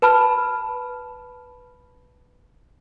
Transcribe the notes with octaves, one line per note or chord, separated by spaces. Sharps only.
B4 A5 B5 F6